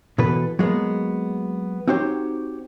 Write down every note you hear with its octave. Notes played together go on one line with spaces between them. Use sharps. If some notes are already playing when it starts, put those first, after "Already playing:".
B2 E3 A4 B4
F#3 G#3 A#3 B3
C4 D#4 F#4 G4 C5 C#5